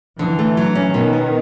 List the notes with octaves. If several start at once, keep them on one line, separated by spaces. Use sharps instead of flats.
D3 E3
A3
F#3
C#4
B2 D#3
B3